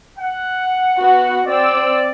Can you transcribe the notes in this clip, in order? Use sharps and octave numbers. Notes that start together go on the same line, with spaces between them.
F#5
B3 F#4
C4 D5 E6